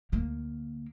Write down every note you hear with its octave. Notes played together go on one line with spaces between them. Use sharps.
D2 A#3